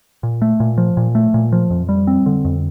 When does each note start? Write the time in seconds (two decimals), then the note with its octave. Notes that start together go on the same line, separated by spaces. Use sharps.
0.23 A#2
0.42 A3
0.60 A#2
0.78 F3
0.97 A#2
1.15 A3
1.34 A#2
1.52 F3
1.70 F2
1.89 G3
2.07 C4
2.26 D3
2.45 F2